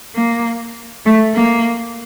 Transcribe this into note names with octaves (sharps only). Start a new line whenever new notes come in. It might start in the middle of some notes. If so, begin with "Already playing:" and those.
A#3
A3
A#3